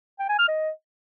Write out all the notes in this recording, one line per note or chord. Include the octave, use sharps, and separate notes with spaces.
G5
G#5
F6
D#5